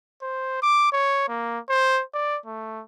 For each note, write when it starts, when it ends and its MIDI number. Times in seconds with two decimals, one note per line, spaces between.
0.22 0.59 72
0.62 0.89 86
0.92 1.24 73
1.28 1.59 58
1.69 2.02 72
2.14 2.38 74
2.46 2.83 57